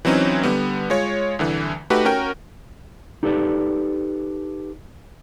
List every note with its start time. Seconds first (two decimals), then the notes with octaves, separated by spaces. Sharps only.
0.05 E3 F#3 C4 C#4 D#4
0.43 D3 G3 B3
0.90 G#3 F4 C#5
1.39 C2 D3 E3
1.90 A3 D#4 F#4 G4 B4
2.05 C#4 F#4 A#4 G5
3.23 D#4 G4 A4 B4 D5